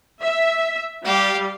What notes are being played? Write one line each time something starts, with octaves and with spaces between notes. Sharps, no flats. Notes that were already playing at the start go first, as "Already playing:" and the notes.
E5
G3 G4 F5